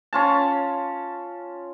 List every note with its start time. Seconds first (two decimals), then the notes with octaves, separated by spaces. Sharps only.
0.13 C#4 F4 A5